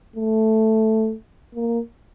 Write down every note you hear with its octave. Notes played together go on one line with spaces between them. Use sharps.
A3
A#3